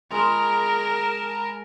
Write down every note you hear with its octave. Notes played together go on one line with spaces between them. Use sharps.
G#3 G#4 A#4 A5 A#5